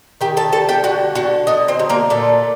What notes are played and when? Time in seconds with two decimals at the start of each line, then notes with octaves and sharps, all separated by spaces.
0.21 D#3 G4 G5
0.37 A4 A5
0.53 G3 A4 A5
0.69 G4 G5
0.84 D3 F#4 F#5
1.15 D3 F#4 F#5
1.47 D3 D#4 D#5
1.68 C4 C5
1.79 F#3
1.89 A#3 A#4
2.10 A#2 A3 A4